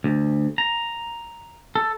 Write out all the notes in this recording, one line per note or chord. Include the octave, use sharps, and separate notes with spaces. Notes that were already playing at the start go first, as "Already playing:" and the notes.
D2
A#5
A4